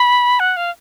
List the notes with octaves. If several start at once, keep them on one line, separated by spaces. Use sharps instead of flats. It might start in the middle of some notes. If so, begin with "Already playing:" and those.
Already playing: B5
F#5
F5